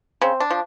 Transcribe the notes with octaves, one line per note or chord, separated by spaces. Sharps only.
C#3 C4
D4
F3